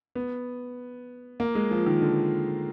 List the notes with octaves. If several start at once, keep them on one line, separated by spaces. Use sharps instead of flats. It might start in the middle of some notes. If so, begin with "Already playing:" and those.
B3
A#3
G#3
F3
D#3
D3